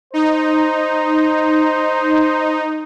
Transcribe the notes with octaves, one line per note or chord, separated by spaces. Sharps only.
D#4 C5